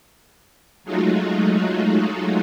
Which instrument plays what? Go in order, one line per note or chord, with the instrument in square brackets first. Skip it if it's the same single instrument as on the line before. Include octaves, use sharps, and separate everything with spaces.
[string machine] F#3 G#3 A3 D#4 F4 F#4